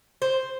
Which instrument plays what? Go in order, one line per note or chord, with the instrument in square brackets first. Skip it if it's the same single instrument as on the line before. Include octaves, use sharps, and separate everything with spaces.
[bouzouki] C5